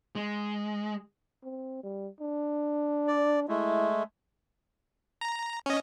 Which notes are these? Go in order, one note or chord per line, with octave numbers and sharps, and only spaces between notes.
G#3
C4
G3
D4
D5
G#3 A3 E4
A#5
C#4 D#5